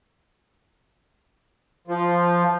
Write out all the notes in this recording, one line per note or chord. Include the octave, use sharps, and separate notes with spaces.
F3